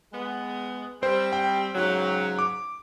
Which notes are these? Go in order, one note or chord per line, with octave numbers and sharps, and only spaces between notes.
G#3 B3
G3 C4 C5
G5
G#2 C#3 F#3
D6